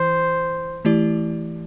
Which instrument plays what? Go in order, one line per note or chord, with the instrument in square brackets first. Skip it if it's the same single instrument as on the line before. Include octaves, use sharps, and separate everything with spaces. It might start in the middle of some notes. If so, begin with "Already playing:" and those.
Already playing: [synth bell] E3 E4 [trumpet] C5
[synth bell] E3 A3 E4 G4 D5